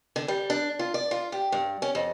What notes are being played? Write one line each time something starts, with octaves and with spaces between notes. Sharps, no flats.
D3
G3
D4
F4
D5
F4
G4
G2
C#4
F2